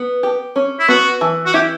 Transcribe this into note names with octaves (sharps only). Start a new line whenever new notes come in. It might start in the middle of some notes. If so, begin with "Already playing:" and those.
Already playing: B3
G4
C#4
E4
B3 F#4
E3
F#4
E4 G4